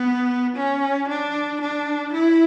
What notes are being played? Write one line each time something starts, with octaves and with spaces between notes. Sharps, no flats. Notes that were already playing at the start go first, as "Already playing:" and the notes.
Already playing: B3
C#4
D4
D4
E4